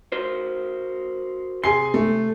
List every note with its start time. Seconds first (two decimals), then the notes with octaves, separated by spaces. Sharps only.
0.12 F#4 A#4 C5
1.64 C3 G#4 G#5 C6 C7
1.94 A3